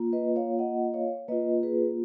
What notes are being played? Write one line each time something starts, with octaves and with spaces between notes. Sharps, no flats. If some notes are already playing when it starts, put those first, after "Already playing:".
Already playing: A#3 F4
B4 D#5
C#5 F5
D#5 F#5
D#5
C#5 F5
A#3 F4 B4 D#5
G#4 B4